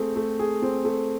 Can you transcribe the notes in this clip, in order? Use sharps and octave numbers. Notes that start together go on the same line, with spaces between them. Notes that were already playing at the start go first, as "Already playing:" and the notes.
Already playing: A3 C4 G#4
A3
G#4
C4
A3